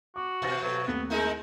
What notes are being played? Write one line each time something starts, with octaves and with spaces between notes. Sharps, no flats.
F#4 D6
B2 B4 A6 A#6
F#3 A4 B4
D#2 A3 B3 C4
G#3 D#4 E4 A#4